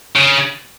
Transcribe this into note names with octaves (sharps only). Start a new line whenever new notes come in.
C#3